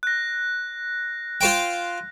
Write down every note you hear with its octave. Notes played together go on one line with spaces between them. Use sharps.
F#6 A#6
F4 C5 G5